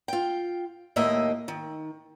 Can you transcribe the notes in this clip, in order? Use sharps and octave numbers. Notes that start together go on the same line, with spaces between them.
F4 G5
D#2 A2 A#3 D#5 E5
D#3